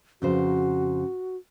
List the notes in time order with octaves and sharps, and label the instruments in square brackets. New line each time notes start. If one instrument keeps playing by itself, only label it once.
[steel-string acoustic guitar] F2 C#3 C5 [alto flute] F#4